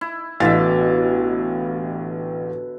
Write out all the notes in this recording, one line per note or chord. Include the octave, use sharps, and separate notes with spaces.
E4
A1 B2 D3 E5 F5 A6